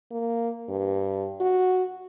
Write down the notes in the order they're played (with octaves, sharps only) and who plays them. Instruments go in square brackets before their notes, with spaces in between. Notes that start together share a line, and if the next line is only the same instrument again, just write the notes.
[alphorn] A#3
G2
F#4